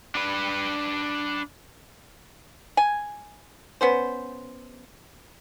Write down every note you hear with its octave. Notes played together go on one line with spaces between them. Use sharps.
D4 B4
G#5
B3 C#4 C5